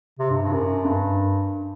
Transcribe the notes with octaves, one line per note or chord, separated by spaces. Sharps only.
C3
G2
G2
F#2
G2